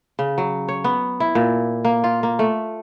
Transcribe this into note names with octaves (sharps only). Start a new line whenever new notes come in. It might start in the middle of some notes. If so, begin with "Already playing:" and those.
C#3
F#3
C#5
B3
E4
A#2
A#3
F4
A#3
A3